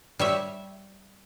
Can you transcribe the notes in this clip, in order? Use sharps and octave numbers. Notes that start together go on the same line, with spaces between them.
G3 C#5 E5